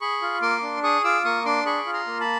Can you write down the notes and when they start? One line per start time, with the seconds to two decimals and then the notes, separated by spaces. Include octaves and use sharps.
0.01 G#4 B5 C#6
0.22 F4
0.42 A#3 C6 D6
0.62 D4
0.83 G#4 C#6 D#6
1.04 F4 D6 E6
1.24 A#3 C#6 D#6
1.45 D4 C6 D6
1.66 G#4 B5 C#6
1.86 F4
1.93 A#5 C6
2.07 A#3
2.20 A5 B5